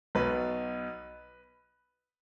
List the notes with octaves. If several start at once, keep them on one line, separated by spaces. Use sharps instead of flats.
B1 B2 B4